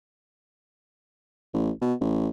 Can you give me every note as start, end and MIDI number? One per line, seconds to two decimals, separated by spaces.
1.54 1.70 33
1.81 1.94 47
2.01 2.29 33